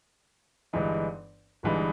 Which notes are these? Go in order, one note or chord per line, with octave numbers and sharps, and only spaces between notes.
G1 G2 E3 G#3 D#4
G1 G2 E3 G#3 D#4